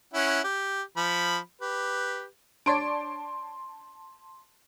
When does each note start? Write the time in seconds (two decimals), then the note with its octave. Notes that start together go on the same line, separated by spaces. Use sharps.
0.14 C#4 E4 F#5
0.44 G4
0.97 F3 B5
1.61 G4 B4
2.66 D4 C#5 D5 A5 C6 D7